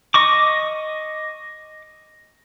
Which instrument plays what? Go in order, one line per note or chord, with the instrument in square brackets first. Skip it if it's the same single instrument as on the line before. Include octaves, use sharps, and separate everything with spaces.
[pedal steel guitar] D#5 C#6 D6